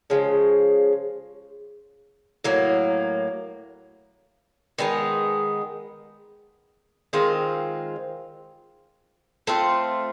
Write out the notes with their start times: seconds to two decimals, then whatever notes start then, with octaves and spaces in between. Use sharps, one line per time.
0.10 C#3 F3 G#3
2.44 A2 F#3 A#3
4.78 D#3 G#3 B3 D#4
7.13 D#3 G#3 C4 F4
9.47 A3 C4 F4